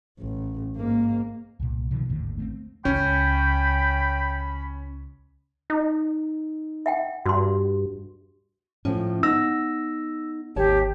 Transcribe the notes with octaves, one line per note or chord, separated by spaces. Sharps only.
A1
G#2 A#3
C2 A#2
B2 D3 D#3 F3
G#1 D#2 A2 D3
A3 A#3 C4
C#2 C#4 G5 B5
D#4
E5 F#5 G5
G2 F#4 C6
A2 F3 C#4
B3 D#4 E6 A#6
G#1 D#2 G4 C#5 A5